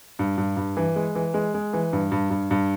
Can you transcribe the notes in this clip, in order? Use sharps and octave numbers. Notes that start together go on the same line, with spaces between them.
G2
G2
G2
E3
G#3
E3
G#3
G#3
E3
G2
G2
G2
G2